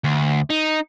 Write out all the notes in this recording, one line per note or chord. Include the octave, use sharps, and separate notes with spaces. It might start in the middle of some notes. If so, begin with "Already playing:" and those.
D2
D#4